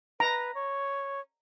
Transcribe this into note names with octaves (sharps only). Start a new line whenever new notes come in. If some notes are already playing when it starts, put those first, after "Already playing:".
B4 A#5
C#5